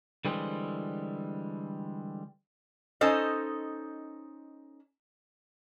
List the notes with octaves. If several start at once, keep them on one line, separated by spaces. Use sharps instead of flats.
D3 E3 G3 G#3 C4
C#4 D#4 A4 C5 D#5